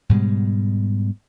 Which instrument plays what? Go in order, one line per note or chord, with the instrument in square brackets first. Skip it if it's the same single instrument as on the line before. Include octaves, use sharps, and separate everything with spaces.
[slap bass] G#2 B2 G3 G#3